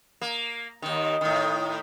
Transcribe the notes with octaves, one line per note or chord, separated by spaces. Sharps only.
A#3
D#2 D#3
A2 D#3